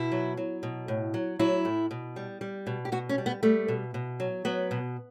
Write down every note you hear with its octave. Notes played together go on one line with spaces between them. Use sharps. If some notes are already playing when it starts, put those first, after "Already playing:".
Already playing: B2 E4
F#3
F#3
B2
A2
F#3
F#3 E4
A2
B2
G3
G3
B2
G4
B2 F#4
C#4
G3
B3
G3 A3
B2
B2
F#3
F#3 B3
B2